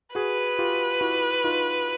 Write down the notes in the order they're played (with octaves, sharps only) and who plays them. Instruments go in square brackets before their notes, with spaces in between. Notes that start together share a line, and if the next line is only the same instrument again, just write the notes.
[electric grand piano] F#4 G#4 [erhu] B4
[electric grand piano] F4 G4
E4 F#4
D#4 F4